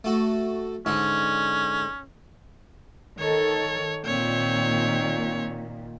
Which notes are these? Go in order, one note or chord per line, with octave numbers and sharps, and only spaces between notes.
A3 F#4
G#2 D3 C#4 D#4
D#3 A4 C#5
A#2 D#3 C4 C#5